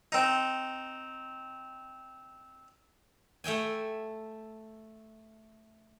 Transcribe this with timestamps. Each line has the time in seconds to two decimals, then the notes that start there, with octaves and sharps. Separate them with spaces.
0.12 C4 D#4
3.44 A3 E5 G5 G#5